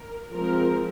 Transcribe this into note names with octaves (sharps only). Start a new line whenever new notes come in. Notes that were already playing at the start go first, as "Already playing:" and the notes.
Already playing: A#4
F3 G#3 C4 A#4